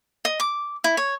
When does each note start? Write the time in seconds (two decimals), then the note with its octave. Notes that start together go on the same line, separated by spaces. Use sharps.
0.25 D#5
0.40 D6
0.84 E4
0.97 C#5